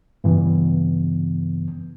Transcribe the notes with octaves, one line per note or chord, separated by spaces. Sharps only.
G2 C#3 E3 B3